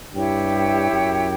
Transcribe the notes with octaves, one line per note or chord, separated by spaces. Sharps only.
G2 E4 G4 C#5 G5
F#2